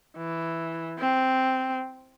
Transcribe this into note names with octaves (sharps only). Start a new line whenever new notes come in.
E3
C4